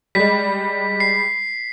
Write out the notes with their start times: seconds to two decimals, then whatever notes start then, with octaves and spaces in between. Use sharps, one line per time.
0.15 G3 G#3 B6
1.00 C7